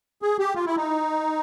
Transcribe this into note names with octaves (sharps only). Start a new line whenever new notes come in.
G#4
G4
F4
E4
D#4